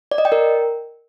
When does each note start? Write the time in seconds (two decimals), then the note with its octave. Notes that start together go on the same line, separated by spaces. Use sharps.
0.12 D5
0.18 D#5
0.25 G5
0.32 A#4